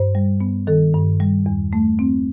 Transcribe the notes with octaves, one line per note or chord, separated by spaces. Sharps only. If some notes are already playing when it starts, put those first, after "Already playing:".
Already playing: G2 C5
G3
B3
D#3 A4
G2
G3
E2
A3
C4